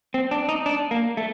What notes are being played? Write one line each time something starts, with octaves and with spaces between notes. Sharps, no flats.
C4
D4
D#4
D4
A#3
A3